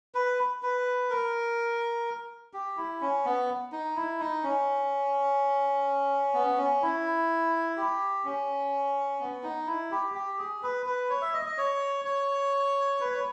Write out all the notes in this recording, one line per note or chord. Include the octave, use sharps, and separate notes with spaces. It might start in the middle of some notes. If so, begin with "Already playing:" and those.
B4
B4
A#4
G4
E4
C#4
B3
D#4
E4
D#4
C#4
B3
C#4
E4
G4
C#4
B3
D#4
E4
G4
G4
G#4
B4
B4
C#5
E5
D#5
D#5
C#5
C#5
B4
C#5